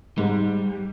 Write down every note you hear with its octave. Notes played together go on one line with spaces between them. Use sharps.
G#2 G3